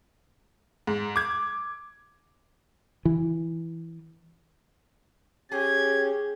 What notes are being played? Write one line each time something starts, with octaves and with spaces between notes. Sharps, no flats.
G#2
D6 G#6
E3
C#4 G4 G#4 G#6